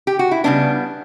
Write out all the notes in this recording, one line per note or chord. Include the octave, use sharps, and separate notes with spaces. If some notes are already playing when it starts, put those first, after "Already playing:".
G4
F#4
E4
C#3 G3 B3 D4